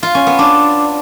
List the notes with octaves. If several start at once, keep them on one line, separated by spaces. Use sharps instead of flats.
F4
C#4
B3
D4